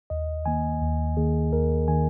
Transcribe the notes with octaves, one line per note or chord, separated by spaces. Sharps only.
D#2 D#5
D#3 A#3 G#5
D#2
D#3 A#3 G#4
D#2 A#4
D#3 A#3 G#5